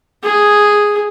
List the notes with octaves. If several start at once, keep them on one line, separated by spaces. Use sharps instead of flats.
G#4